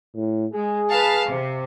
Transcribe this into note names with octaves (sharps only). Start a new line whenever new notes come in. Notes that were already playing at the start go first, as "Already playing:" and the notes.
A2
G#3 G#4
B4 F5 A5
C3